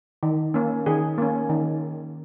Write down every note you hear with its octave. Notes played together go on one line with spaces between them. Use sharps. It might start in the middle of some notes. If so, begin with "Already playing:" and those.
D#3
A#3 C#4
D#3 G#4
A#3 C#4
D#3